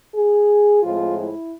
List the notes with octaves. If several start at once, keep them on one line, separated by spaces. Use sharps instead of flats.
G#4
A2 F3 G#3 C4 F4
E4